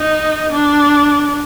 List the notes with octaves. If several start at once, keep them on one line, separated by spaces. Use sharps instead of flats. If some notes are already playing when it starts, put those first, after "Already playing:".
Already playing: D#4
D4